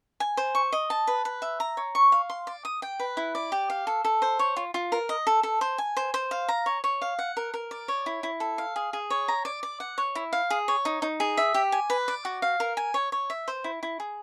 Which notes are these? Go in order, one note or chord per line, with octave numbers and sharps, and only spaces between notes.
G#5
C5
C#6
D#5
A5
B4
B4
E5
A#5
C#5
C#6
F5
C6
D5
D#6
G5
B4
E4
D5
G4
F5
A4
A4
C5
C#5
F4
F4
A#4
D#5
A4
A4
C5
G#5
C5
C5
F5
A#5
C#5
C#5
F5
F#5
A#4
A#4
D5
C#5
E4
E4
A4
F5
G#4
G#4
C#5
A#5
D5
D5
F#5
C#5
E4
F5
G#4
C#5
D#4
D#4
G#4
E5
G4
G#5
B4
D5
F#4
F5
A#4
G#5
C#5
C#5
E5
C5
E4
E4
G#4